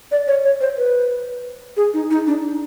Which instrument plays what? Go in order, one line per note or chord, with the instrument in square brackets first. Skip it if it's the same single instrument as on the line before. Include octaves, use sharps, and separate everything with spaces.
[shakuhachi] D5
C#5
C#5
C5
B4
G#4
D#4
D#4
D4